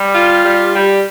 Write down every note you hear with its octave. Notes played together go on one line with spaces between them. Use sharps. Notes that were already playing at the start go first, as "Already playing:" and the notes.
Already playing: G3
F4
G3
G3